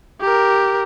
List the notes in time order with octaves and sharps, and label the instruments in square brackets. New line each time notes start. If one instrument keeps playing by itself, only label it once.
[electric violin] G4 A#4